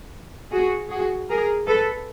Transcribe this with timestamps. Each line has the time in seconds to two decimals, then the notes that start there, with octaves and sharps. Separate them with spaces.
0.52 F#4 G#4
0.90 F#4 G#4
1.29 G#4 A#4
1.67 A4 B4